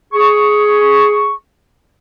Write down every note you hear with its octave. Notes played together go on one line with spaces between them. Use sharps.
G#4 C#6